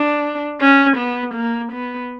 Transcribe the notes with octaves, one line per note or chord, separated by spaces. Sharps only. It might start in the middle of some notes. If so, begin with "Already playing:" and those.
Already playing: D4
C#4
B3
A#3
B3